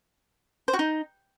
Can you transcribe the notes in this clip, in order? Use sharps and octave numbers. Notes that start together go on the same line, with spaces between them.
C5
F#4
D#4